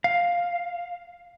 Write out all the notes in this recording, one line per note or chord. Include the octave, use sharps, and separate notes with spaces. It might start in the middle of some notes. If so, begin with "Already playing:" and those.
F5